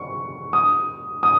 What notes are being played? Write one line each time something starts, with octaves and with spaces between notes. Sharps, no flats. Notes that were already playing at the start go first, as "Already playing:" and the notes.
Already playing: C#6
D#6
D#6